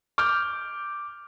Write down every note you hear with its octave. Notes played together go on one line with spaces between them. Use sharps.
D6 F6 G6